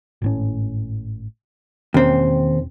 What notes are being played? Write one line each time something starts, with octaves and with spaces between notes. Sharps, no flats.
G#1 A2 C#4
E1 D#2 C4 C#4